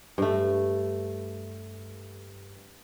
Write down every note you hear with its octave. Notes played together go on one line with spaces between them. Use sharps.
G2 A3